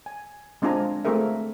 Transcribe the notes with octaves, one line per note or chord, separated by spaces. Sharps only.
G#5
G#3 C4 D4 F4 G#5 A#5
A3 C4 F4 G#4 A#4 E5